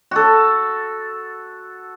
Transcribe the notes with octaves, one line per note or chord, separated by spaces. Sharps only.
F#4 A4